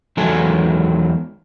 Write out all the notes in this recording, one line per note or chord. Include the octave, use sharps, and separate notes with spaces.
E2 D#3 F#3 G#3 A4 G#5